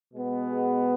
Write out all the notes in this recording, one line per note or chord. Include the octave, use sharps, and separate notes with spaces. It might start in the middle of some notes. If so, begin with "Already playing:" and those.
B2 G#3 B3
G#4